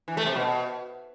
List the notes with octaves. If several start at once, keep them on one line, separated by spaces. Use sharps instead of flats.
E3
A3
C3
B2